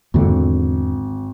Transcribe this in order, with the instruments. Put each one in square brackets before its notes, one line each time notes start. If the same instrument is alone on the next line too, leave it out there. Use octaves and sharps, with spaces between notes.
[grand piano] G#1 [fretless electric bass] E2 D3